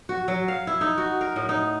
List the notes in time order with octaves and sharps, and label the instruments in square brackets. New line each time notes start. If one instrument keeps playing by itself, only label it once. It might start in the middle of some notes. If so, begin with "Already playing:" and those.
[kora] F#4
F#3
F5
E4
D#4
F#4
A#4
A2
D#4